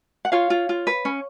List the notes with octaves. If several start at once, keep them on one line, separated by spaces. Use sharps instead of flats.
F#5
F4 C#5 F5
F4
F4
B4
C#4